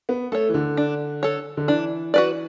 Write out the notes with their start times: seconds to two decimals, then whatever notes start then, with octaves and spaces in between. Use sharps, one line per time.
0.09 B3
0.32 A3 A4 C#5
0.49 E3
0.54 D3
0.77 D4
1.23 A4 C#5
1.57 D3
1.68 E3 D4
2.14 F#4 B4 D5